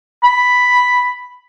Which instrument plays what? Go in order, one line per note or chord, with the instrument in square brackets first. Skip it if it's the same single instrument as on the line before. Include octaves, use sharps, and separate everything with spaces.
[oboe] B5